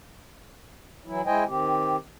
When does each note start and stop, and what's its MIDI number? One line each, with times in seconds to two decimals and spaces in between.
1.06 1.21 52
1.06 1.21 54
1.06 1.21 64
1.26 1.44 56
1.26 1.44 64
1.26 1.44 72
1.26 1.44 75
1.26 1.44 79
1.26 1.44 80
1.48 1.96 51
1.48 1.96 60
1.48 1.96 67